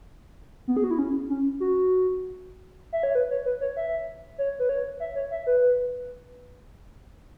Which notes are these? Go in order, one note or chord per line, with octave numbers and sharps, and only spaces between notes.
B3
G#4
F#4
E4
C#4
C#4
F#4
E5
C#5
B4
C#5
B4
C#5
E5
C#5
B4
C#5
E5
C#5
E5
B4